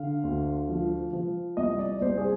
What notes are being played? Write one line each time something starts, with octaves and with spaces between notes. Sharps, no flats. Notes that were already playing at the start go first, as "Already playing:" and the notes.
Already playing: D3 F5
D2
F3
F3
C2 D#5
D5
C2 C5
G#4